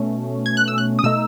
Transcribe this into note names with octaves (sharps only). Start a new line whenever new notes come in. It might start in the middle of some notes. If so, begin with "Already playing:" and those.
Already playing: B2 A3 C#4
G#6
F#6
E6
F#6
D#6
B2 A3 D#4 E6